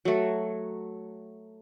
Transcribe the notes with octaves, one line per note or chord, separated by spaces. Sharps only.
F#3 A3